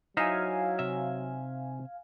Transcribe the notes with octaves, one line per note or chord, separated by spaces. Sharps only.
F#3 D#4 E4 C5 E5 F5 G#5
C3 E5